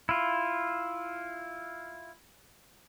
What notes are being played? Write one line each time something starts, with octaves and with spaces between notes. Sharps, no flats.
E4 F4